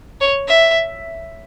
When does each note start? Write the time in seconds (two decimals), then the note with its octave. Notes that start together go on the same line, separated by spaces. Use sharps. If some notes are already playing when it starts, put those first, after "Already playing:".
0.21 C#5
0.48 E5